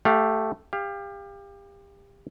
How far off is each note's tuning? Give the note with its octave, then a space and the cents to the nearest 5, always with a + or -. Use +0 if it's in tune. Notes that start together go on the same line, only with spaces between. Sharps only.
A3 +0 G4 +0 F5 +35
G4 +30 F5 +0